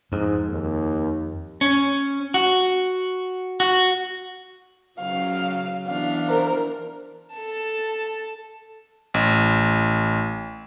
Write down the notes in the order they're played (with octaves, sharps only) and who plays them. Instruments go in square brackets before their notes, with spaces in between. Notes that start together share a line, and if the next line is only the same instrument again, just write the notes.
[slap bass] F2 [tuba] G#2
[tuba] D#2
[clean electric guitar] C#4
F#4
F#4
[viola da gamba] C#3 F#3 [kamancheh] F5
[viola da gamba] E3 B3 D4 [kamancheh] F5
[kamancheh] A#4 C5
[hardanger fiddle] A4 A5
[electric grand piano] A1